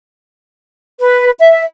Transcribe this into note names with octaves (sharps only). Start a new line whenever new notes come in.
B4
E5